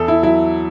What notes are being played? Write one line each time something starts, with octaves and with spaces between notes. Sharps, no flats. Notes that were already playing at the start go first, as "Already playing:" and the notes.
Already playing: E2 A4
E4
F#3 E4